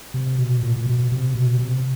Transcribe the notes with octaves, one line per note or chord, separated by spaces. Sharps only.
C3
B2
A#2
A#2
B2
C3
B2
C3